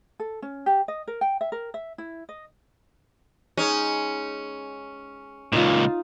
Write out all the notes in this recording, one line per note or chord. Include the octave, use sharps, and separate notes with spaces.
A4
C#4
G4
D#5
A#4
G5
E5
A#4
E5
E4
D#5
G#3 C#4 D#4
C#2 A#2 D#4 F4